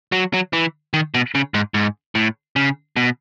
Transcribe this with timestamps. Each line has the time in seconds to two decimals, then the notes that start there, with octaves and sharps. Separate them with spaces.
0.12 F#3
0.34 F#3
0.53 E3
0.94 D#3
1.14 B2
1.35 C#3
1.54 G#2
1.74 G#2
2.15 A2
2.56 C#3
2.96 B2